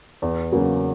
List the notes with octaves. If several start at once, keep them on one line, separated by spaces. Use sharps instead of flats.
E2
C#3 F#3 A#3